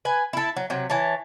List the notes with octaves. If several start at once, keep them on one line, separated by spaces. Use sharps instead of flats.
B4 G#5
E4 A4
F#3
C3 F#3
E3 C#5 A5